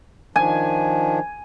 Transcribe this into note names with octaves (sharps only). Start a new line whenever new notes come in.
D#3 F3 D4 G#5